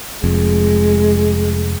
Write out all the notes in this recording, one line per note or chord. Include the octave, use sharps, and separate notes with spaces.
F1 F2 G#3